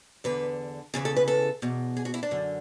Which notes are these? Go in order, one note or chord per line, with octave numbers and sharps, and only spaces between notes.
E2 D3 B4
E2 C#3 E3 G#4
A4
B4
A4
E2 B2
G#4
F#4
E4
D4
F#2 D3